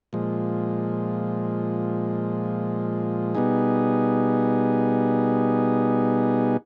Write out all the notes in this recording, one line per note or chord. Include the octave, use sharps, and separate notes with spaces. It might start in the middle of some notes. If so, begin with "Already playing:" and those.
A#2 F3 G#3
B2 G3 B3 D#4 G#4